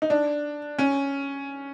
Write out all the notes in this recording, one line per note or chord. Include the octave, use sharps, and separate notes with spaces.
D#4
D4
C#4